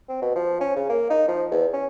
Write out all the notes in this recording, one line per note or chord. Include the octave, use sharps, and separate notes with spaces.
C4
B2
F3
C#4
C#3
A#3
D#4
F3
E2
C#4